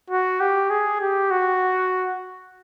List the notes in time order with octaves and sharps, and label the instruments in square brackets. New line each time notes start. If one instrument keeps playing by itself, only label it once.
[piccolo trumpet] F#4
G4
G#4
G4
F#4